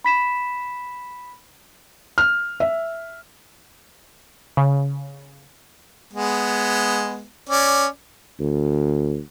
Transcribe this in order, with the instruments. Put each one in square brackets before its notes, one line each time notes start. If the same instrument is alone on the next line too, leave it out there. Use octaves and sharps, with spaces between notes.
[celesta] B5 B6 E7
[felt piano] F6
E5
[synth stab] C#3
[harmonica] G#3 B3
C#4 D5
[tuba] D2